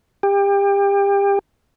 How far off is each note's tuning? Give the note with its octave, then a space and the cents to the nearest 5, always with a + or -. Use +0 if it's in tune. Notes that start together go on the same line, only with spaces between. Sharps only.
G4 +30